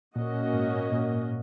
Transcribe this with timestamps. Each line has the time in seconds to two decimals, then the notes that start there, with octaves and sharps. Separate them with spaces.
0.16 A#2 A#3 C#4 F#4 D#5
0.53 G#2
0.92 A#2